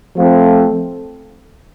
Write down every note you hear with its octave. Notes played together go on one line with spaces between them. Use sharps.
F3 A3 C4 F4 A4